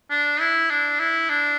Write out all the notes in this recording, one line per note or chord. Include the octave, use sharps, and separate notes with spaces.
D4
E4
D4
E4
D4